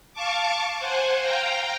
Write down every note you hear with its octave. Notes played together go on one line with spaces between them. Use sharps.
F5 A5 C#6 D6
C5 F#5 G#5
F5 G5 A#5